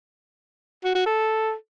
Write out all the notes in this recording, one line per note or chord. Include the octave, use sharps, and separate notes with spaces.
F#4
F#4
A4